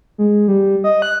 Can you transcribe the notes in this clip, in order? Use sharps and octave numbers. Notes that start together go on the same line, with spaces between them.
G#3
G3
D#5
F#6